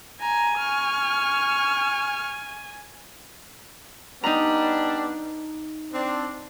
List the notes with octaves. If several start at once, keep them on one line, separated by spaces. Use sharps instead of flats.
G#5 A#5
C#6 F6
G3 B3 D4 D#4 A#5
C4 D4